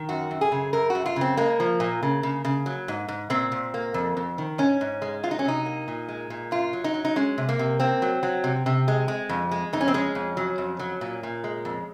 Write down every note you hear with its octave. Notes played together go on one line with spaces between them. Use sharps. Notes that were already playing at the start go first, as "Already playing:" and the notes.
Already playing: D#3
F#2 F#4
F#2
G#4
C#3
F#2 A#4
F#2 F#4
F4
C#3 C4
G#3 A#3
F3
A#2
C#3
C#3
C#3
F#3
G#2
G#2
A#2 C4
A#2
A#3
F2
F2
D#3
G#2 C#4
G#2
G#3
F#3 F4
D#4
C#4
C3 D#4
A#3
A#2
G#3
A#2
F#2 F4
F#3
D#4
F#3
D#4
G#3 C#4
C3
A#3
C3
A#3 C4
F#3
F#3
C3
C3
G#3
G#3
F2
G#3
F2 D#4
C#4
C4
G#3 C#4
F2
F#3
F2
F#3
A#2
A#2
G#3
F2